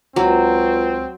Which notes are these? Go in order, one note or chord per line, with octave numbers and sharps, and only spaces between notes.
C#2 F#3 C4